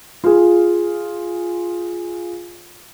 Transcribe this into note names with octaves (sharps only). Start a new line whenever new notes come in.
F4 G#4